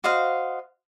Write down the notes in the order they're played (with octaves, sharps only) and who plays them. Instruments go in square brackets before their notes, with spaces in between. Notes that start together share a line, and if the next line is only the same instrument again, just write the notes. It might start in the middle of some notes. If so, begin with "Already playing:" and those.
[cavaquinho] F#4 C5 D#5 F5